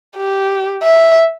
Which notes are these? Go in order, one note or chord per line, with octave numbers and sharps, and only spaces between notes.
G4
E5